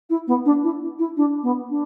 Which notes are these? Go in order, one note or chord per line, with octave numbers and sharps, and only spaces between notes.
E4
B3
D4
E4
E4
D4
B3
D4